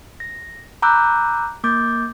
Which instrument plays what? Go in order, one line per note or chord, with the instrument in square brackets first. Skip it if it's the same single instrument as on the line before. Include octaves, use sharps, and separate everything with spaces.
[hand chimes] A#6
A#5 B5 D6 E6 F#6 G6
A#3 D6 G6 A6